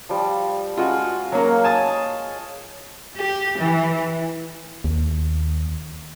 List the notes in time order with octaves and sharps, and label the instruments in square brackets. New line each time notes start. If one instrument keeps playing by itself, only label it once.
[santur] F3 G3
[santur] G#3 [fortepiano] F4 F#4
[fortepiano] F#3 A#3 [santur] C#5 F5
[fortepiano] G#5 A5 D#6
[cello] G4
E3
[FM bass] D#2